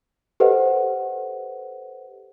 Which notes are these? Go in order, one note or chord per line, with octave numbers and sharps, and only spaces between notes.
G4 A4 B4 C5 D#5 F#5